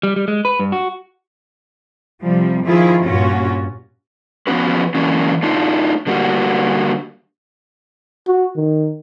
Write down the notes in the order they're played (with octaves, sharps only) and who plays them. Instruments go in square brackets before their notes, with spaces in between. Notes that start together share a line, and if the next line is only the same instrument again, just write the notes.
[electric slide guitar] G3
G3
G#3
B4
G2
F#4
[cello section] C3 F3 G3
D#3 F3 E4 F4 G#4
G2 A#2 C#4 F4 F#4
[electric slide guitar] F3 B3 C#4 F#4 B4
E3 F#3 A#3 C#4 D4
A3 D4 D#4 F4
D3 G3 A#3 E4 F#4
[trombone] F#4
D#3